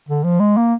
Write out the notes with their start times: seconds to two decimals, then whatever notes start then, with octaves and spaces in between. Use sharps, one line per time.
0.08 D3
0.24 F3
0.40 G#3
0.57 A#3